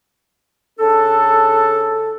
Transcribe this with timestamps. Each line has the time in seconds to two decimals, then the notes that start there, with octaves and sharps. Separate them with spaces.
0.79 C#3 D4 A4